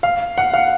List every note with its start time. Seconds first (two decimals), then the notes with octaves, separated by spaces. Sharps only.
0.03 F5
0.38 F#5
0.54 F5